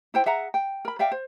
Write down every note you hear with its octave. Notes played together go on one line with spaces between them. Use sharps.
E4 C5 G5
G#4 E5 F#5 A#5
G5
A#4 B5
D5 E5 F5 G5
C5